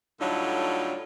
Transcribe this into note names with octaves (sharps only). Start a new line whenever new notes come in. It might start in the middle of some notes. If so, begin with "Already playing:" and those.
A2 D3 F#3 G3 D#4 F4